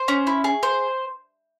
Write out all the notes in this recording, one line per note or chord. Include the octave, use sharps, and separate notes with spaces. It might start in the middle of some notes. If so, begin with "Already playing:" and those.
Already playing: C5
C#4
E4
G#4
C5